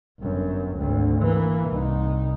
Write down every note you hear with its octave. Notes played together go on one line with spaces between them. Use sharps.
G1 F#2
G#1 D2
E3 A#3
C2 D#4